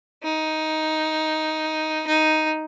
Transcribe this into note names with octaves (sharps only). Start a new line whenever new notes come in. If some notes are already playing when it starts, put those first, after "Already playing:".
D#4
D#4